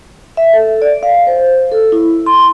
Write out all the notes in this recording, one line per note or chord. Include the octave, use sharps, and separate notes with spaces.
E5
A4
D5
F5
C5
A4
E4
C6